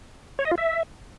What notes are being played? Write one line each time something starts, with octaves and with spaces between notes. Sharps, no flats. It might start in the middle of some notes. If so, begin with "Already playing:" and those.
C#5
D#5
F4
E5